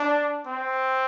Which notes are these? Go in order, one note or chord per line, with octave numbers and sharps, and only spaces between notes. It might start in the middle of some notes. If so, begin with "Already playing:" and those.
Already playing: D4
C4